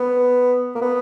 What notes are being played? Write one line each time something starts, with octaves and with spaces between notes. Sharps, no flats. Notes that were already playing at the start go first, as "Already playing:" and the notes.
Already playing: B3
A#3
B3